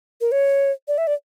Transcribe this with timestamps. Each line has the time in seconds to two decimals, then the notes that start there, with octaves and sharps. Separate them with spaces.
0.21 A#4
0.32 C#5
0.88 D5
0.98 E5
1.07 D5